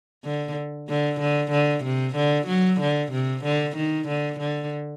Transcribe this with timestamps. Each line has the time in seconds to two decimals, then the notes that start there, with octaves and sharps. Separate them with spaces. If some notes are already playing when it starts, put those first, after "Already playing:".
0.24 D3
0.89 D3
1.20 D3
1.51 D3
1.84 C3
2.16 D3
2.47 F#3
2.80 D3
3.12 C3
3.44 D3
3.76 D#3
4.08 D3
4.40 D3